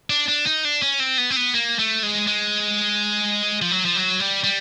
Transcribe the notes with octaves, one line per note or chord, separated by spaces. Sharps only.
D4
D4
D#4
D4
C#4
C4
B3
C4
B3
A#3
A3
G#3
G#3
F3
F#3
F3
F#3
G3
G3